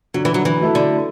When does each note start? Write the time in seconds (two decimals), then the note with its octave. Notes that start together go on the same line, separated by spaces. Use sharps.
0.14 D3 F#3
0.25 E3
0.34 F#3
0.45 E3
0.59 F#3 A3 E4 A4
0.75 D3